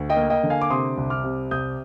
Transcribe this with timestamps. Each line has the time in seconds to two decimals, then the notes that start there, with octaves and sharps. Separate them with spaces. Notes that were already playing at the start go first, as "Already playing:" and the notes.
Already playing: D2
0.10 D#5 G5
0.16 A#3
0.30 D#5 G5
0.43 D3
0.50 F5 G#5
0.62 D6
0.70 C3 C6 D#6
0.97 C2
1.10 D6 F6
1.24 C3
1.51 C2 D#6 G6